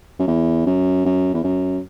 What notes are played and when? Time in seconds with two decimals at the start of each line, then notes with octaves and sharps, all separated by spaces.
0.19 F#2
0.28 E2
0.66 F#2
1.05 F#2
1.34 E2
1.44 F#2